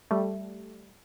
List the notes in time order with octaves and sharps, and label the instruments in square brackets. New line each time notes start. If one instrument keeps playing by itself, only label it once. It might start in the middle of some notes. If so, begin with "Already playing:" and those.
[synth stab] G3 A3